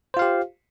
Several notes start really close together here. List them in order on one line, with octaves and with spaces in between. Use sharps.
C5 F4 F5 G4